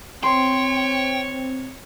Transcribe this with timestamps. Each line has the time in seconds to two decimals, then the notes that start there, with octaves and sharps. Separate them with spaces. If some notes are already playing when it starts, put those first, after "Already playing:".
0.23 C4 C#5 G5 C6